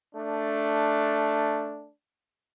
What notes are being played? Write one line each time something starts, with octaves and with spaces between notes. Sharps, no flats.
A3 D4